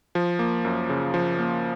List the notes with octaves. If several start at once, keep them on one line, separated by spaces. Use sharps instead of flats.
F3
A#3
F#2
C#3
F3
A#3